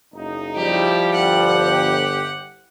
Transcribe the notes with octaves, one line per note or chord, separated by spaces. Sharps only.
F#1 D#4
F3 G3 E4 G4
G1 G4 F#5